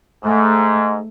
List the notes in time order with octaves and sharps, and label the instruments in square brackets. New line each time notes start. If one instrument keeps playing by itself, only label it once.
[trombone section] G#2 [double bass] A3